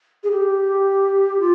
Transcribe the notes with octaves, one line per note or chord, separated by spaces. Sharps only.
G#4
G4
F4